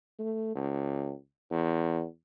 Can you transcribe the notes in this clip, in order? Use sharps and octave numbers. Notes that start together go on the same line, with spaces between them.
A3
C#2
E2